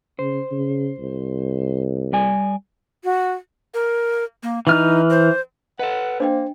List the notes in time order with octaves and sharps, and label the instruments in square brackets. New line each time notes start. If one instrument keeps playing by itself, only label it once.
[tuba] C#3 [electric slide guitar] C5
[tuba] C#3
C2
[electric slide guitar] G3 D5 G#5
[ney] F#4
[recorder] A#4
A#3
[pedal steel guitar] E3 F6 [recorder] D#4
[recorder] C5
[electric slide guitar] A4 B4 [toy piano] D#5 F5 [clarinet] F#5
[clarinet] A#3 [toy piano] D4 D#5 G5 [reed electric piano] C5